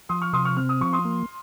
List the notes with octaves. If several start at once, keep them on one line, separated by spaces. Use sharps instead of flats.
F3 C6 D#6
C#6 F6
C3 C6 D#6
C#6 F6
C4 F6
D#6
F3 C#6
C6 D#6
A#3